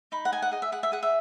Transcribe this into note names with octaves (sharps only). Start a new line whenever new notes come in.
D#4 B5
F#5
D#5 G#5
F#5
G#4 D#5
E5
G#4 F#5
E5
G#4 F#5
E5